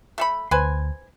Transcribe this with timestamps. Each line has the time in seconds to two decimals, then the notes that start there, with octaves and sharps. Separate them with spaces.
0.18 A3 A4 B5
0.51 D2 B4 C5 G#5